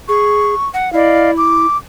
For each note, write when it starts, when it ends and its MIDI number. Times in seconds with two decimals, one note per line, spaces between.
0.09 0.55 68
0.09 0.68 85
0.74 0.92 78
0.93 1.66 64
0.93 1.30 74
0.93 1.30 75
0.93 1.30 77
1.38 1.76 86